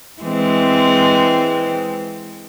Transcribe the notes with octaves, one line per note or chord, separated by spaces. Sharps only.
E3 G#3 C4